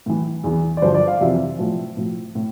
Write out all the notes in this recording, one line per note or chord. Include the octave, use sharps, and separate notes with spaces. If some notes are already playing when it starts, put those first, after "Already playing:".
A2 E3
E2 E3
D5
G2 D3 F3 C5
D5
F5
F2 C3 E3 E5
A2 F3
A2 F3
A2